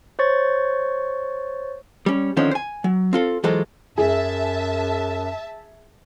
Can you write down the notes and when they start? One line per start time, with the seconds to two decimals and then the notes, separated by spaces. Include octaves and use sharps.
0.19 C5 C#5 C#6 A6
2.06 G3 C#4
2.37 D3 D#3 F3 C4 C#4 C5
2.51 C5 G#5
2.84 F#3
3.13 C4 F4 A4
3.44 E3 F#3 G#3 F4 A4 C5
3.98 F#2 G#4 E5 A5